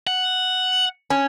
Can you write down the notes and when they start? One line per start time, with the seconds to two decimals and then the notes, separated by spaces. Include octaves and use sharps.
0.07 F#5
1.10 C#4